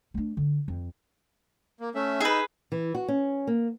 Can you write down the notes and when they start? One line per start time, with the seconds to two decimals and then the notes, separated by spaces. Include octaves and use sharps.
0.14 A3 D4
0.37 D3
0.68 F2
1.80 A#3
1.95 A3 C#4 E5
2.21 D#4 G#4 B4 E6
2.72 E3
2.95 F#4
3.08 C#4
3.47 A#3